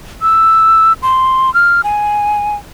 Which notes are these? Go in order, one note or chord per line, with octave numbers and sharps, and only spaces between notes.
E6
C6
F6
G#5